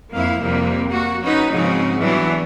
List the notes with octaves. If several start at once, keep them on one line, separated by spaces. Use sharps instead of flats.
F2 A#3 E4 F5
F2 C3 G3 A#3
A#3 F#4
C#4 D#4 F#4 B4
G#2 C#3 F3 C4 D#4 F#4
E3 F#3 G3 B3 D4